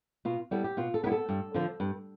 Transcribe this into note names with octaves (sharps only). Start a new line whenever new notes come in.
B2 F4
G3 B3 E4 A4
G4
B2 F4
A4
G3 B3 E4 B4
A4
G2
D3 F3
G2